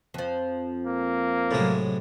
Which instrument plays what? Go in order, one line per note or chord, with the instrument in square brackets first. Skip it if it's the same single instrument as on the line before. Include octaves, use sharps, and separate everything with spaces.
[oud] F2 F3
[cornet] A#3
[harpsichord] A2 G#3 [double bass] C3 F#3